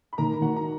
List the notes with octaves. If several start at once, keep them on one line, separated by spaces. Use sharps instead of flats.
B5
D#3 A#4 A#5
D#3 F#4 F#5
A#5